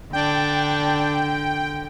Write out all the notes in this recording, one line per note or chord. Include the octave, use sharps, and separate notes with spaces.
D3 D4 G5